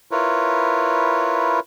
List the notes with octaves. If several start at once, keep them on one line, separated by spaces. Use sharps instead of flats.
E4 F4 A#4 B4 C#5